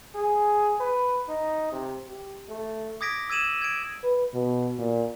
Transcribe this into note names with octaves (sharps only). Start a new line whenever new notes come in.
G#4
B4
D#4
C3
G4
A3
D6 D#6 G#6 A#6 B6 D7
E6 G#6 D#7 E7 F#7
G#6 D7
B4
B2
A#2